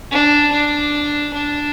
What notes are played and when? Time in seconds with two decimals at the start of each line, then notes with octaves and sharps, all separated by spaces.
0.11 D4
0.52 D4
1.33 D4